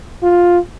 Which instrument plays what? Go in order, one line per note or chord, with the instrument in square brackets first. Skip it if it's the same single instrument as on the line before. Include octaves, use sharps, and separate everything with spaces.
[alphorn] F4